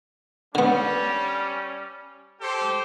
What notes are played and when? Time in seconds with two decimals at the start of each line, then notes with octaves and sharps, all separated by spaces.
0.55 D3 G3 B3 C#4
2.41 G4 A4 C5